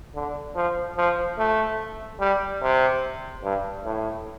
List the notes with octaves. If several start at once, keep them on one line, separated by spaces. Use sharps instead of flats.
D3
F3
F3
A3
G3
C3
G2
A2